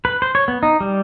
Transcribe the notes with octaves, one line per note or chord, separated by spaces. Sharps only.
B4
C5
C#5
B3
D#4
G3